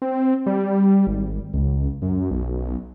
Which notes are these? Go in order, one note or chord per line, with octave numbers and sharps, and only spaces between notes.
C4
G3
G#1
C#2
F#2
B1